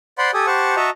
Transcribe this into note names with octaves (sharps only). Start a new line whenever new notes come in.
C5 D5 F#5 B5 C6
G4 A4 G#5 D#6
G4 C5 F#5 A5 C#6
F#4 D#5 E5 A5 A#5 C#6